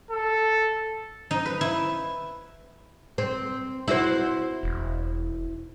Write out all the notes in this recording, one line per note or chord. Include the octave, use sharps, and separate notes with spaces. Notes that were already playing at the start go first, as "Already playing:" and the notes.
A4
D#4
B4
E4
C4
E4 F#4 C5
E1